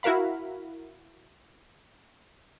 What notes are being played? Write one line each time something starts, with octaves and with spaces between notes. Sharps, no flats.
E4 F#4 A#4 F5 B5